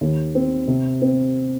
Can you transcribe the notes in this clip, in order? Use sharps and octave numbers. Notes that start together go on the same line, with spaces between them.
D#2
C4
C3
C4